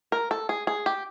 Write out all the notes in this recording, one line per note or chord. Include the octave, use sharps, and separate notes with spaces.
A#4
A4
G#4
G#4
G4